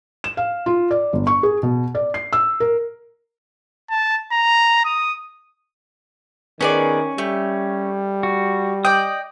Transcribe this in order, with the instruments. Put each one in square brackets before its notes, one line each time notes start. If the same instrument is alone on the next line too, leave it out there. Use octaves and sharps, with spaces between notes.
[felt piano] E7
F5
F4
D5
G1
C#6
G#4
B2
D5
C7
E6
A#4
[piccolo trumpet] A5
A#5
D#6
[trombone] D#3 [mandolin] B3 G#4 D5 [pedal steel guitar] C#4
[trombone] G3 [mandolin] A3 G4
[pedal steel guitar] F#4
[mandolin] D5 G5 [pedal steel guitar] D#5 D#6